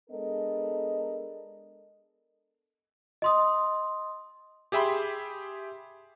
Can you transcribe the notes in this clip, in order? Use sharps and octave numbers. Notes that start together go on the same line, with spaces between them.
G#3 B3 D4 A4 A#4 D#5
D#5 C6 D#6
G4 G#4 E5 G5 B5 C6